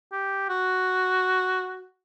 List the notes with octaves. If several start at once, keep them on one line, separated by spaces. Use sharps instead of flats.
G4
F#4